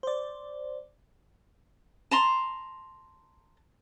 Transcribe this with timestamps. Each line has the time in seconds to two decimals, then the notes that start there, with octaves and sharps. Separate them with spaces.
0.03 C5 D5
2.11 A5 A#5 C6